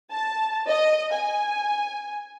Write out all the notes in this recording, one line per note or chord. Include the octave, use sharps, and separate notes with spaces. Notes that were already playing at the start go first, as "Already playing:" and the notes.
A5
D#5
G#5